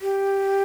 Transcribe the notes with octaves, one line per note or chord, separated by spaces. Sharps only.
G4